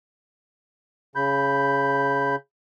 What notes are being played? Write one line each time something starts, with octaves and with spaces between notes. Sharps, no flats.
C#3 B5 G6